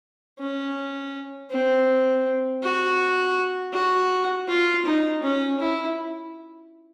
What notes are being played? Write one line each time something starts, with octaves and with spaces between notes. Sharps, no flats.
C#4
C4
F#4
F#4
F4
D#4
C#4
E4